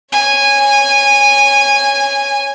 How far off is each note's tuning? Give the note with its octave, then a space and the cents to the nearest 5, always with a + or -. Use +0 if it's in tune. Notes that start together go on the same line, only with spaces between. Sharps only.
C#5 +0 G#5 -15